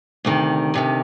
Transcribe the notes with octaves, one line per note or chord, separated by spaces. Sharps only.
D2 C3 D#3
D2 C3 D#3